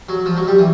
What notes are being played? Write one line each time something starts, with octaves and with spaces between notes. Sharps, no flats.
F#3
F3
F#3
G3
E3